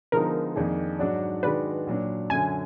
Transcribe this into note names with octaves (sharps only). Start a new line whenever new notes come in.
D3 F3 G#3 B3 D#4 A#4
F2 D#3 A#3 D4 G#4
G#2 F#3 D4 F#4 D5
D#3 G#3 D4 F#4 B4 D5
A#2 F#3 D4
F#2 D3 F#3 G#5